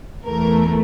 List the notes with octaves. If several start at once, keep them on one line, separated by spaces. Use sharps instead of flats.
E2 E3 A3 A#4